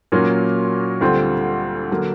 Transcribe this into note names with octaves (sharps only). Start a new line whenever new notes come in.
A#2 F#3 A#3 C#4 F4
D2 D3 G3 C4 F4
D3 F#3 A#3